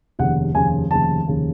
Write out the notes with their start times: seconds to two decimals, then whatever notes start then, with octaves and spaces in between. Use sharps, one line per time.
0.19 F1 D#2 C#3 F3 F#5
0.54 F1 D#2 C#3 F3 G#5
0.90 F1 D#2 C#3 F3 A5
1.26 F1 D#2 C#3 F3